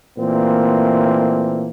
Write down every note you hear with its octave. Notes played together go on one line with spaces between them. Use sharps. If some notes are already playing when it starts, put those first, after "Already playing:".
A#2 E3 A3 A#3 C4